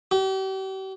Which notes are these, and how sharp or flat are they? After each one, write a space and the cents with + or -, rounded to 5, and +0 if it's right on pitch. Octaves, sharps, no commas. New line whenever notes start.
G4 -40